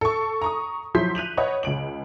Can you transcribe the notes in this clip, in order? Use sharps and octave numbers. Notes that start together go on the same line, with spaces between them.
A4 C#6
A#5 C#6 D#6
F3 F#3 E4 C6 G6 B6
F#6 D#7 F7 F#7
B4 C#5 D#5 F#5
C#2 D7 F#7